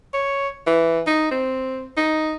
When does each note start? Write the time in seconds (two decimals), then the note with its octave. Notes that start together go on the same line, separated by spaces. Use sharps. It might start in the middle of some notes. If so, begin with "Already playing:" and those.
0.14 C#5
0.67 E3
1.07 D#4
1.31 C4
1.97 D#4